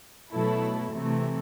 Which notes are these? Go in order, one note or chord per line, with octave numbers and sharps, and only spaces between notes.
B2 F#3 A3 E4 A4
C3 E3 A3